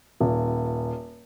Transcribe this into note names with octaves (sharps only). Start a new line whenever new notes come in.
D#1